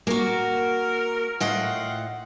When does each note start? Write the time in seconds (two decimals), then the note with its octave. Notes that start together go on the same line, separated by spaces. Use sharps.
0.07 A#3 F#4 A#4
1.40 A2 F4 D#5 F#5 G5